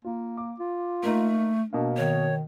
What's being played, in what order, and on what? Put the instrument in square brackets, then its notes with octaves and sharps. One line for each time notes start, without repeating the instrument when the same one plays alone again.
[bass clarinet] A#3 [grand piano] F4
[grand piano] D6
[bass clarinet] F4
[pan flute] A3 [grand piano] A#3 D#4 A#4
[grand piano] B2 A#3 F5 [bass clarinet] D4
[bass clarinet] D#3 [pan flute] C#5